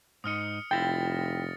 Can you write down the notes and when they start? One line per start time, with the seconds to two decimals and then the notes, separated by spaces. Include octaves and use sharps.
0.24 G#2 D#4 D#6 F6 C#7
0.71 F1 E4 F4 G5 A6 A#6